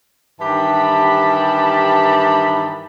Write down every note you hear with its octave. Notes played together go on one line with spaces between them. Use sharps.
G2 D#3 E3 G4 A5 B5